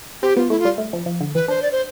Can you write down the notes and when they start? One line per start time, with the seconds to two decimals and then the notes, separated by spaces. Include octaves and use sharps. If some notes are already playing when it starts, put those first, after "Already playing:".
0.22 C4 G4
0.36 B3 F4
0.50 A3 E4
0.59 F4
0.65 G3
0.78 A3
0.93 F3
1.06 F3
1.21 D3
1.35 E3 B4
1.48 D4 C5
1.62 D5
1.72 C5